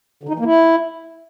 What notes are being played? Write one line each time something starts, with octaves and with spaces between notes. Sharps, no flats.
D3
D#4
E3
A#3
E4